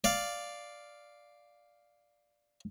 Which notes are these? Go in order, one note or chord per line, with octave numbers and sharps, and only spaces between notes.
D5 F5